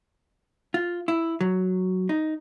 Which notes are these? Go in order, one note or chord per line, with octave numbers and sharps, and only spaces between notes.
F4
E4
F#3
D#4